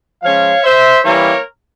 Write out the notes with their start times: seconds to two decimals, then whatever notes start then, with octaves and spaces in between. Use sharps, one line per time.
0.23 F3 G#3 C#4 C#5 F5
0.63 C5 E5
1.03 E3 G3 A#3 C#4 E4 A#4 C#5